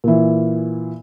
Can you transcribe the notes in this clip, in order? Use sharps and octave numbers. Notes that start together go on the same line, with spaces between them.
A#2 E3